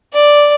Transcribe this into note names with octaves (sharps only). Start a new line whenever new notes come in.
D5